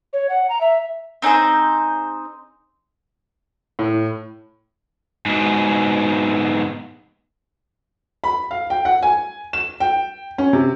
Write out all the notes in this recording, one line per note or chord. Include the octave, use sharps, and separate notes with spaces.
C#5
F#5
A#5
E5
C4 D#4 G#4 C5
A2
G#2 B2
B5
F5
G5
F#5
G#5
E7
G5
C#4
C3